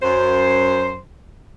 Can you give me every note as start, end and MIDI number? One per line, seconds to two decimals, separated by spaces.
0.02 0.99 42
0.02 0.99 72